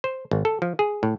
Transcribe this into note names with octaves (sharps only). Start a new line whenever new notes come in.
C5
G#1
A4
F3
G#4
A2